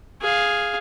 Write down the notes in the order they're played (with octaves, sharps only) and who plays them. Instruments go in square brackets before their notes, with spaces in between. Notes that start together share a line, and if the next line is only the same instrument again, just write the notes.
[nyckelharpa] G#4 F5